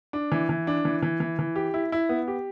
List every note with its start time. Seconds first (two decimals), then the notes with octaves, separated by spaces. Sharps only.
0.13 D4
0.32 E3
0.49 E3
0.67 D4
0.85 E3
1.03 E3
1.20 E3
1.39 E3
1.56 G4
1.74 E4
1.92 E4
2.09 B3
2.28 G4